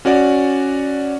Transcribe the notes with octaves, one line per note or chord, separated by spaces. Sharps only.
C#4 F#4 C#5 D5